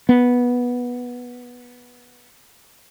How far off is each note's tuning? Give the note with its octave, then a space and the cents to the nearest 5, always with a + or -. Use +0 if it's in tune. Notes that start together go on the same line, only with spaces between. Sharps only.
B3 -10